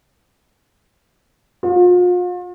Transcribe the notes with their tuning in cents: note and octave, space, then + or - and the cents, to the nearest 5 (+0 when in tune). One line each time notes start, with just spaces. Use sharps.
F4 +40